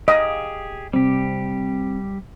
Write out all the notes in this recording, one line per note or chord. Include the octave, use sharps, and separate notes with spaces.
G4 G#4 D#5 F5
C3 G3 C4 G4